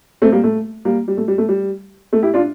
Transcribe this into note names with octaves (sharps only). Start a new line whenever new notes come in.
A3 C4
G3 A#3
A3
G3 A#3
G3
A3
G3
A3
G3
A3
E4 G4
D4 F4